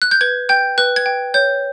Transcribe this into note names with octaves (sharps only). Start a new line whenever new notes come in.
F#6
G6
B4 G#6
G5 G6
B4 F#6
G#6
G5
C#5 G6